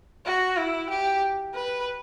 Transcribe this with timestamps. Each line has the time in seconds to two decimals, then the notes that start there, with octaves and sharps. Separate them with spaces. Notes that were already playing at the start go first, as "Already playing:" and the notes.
0.25 F#4
0.57 E4
0.89 G4
1.54 B4